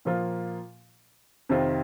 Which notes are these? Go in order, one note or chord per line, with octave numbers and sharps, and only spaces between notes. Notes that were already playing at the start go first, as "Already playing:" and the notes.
A#2 F3 A#3 F4
F2 C3 D#3 C4 F4